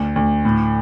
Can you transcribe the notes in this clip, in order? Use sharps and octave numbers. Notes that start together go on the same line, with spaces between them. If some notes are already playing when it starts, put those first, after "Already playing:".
Already playing: D2
D2
A2